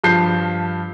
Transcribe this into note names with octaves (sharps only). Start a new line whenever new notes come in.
G2 F3 A5 G6 C7